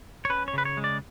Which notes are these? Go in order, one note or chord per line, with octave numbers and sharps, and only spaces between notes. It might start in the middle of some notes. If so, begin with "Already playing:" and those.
C#5
C#4 B4
C#5
C#3 B4
C#5
G#3
D5